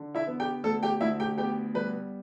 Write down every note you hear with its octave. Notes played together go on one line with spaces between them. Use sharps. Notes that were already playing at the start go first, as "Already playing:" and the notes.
Already playing: D3
E4 E5
B3
G4 G5
D2 A4 A5
G4 G5
D2 E4 E5
G4 G5
B3 G4 G5
G3 B4